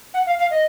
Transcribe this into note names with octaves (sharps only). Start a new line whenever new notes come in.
F#5
F5
F5
D#5